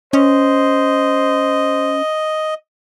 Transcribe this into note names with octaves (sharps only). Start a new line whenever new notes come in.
C#4 C5 D#5